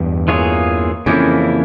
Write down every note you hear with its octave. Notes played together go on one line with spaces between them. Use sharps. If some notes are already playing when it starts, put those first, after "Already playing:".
Already playing: E2 G2
E3 A#3 F4 G#4 C#5
F2 C#3 E3 A#3 C#4 E4